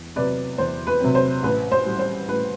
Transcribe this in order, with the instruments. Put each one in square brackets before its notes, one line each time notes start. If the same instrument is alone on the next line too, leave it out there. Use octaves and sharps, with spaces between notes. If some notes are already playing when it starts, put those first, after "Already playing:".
Already playing: [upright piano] E2
C3 F#3 C4 B4 D5
E2 C5
B4
C3 F#3 C4
C5
A1 B4
C5
A2 G3
C5
A1 B4